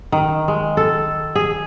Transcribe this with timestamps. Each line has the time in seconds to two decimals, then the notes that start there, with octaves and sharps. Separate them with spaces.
0.12 D#3
0.48 G#3
0.77 A4
1.35 G#4